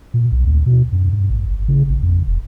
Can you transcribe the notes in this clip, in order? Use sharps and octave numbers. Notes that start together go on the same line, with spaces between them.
A#2
B1
D2
B2
F#2
G2
A1
G#1
C#3
A1
F2
E1